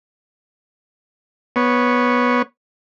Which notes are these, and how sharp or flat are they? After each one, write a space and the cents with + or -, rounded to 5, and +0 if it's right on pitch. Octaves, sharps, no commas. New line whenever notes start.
B3 -10 C#5 +0